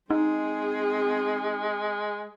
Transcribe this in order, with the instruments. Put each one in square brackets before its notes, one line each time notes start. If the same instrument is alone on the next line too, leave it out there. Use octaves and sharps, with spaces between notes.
[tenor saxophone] G#3 [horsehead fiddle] C4 G#4 [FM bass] D#4